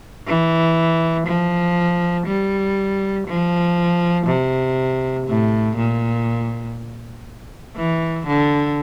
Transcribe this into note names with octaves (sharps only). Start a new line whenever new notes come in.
E3
F3
G3
F3
C3
A2
A#2
E3
D3